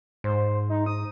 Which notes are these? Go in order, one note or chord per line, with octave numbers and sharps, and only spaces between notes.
G#2 C5
D#4
D#6